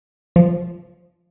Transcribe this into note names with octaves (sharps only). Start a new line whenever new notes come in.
F3